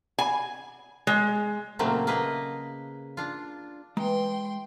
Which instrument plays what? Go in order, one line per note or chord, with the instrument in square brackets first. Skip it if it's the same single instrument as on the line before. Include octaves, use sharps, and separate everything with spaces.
[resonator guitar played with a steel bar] G#5
G#3
[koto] A#2 C#3 F#3 A3 A#3 C4
A#3 G#4 B4 D#5
D4 F4
[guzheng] E3 [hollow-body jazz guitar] G#3 A#5 [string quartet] G5 C6